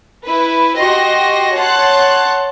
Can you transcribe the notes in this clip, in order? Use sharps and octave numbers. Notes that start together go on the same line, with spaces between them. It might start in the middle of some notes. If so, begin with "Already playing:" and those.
E4 B4
F#4 G4 D#5 C6 A#6
C#5 F#5 A5 C6 F#6